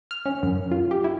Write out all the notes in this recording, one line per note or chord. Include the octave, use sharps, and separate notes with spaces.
F6
C#4
F#2
F4
G4
E4